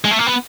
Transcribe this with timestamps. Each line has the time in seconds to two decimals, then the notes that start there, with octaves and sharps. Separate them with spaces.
0.04 G#3
0.11 A3
0.19 A#3
0.27 B3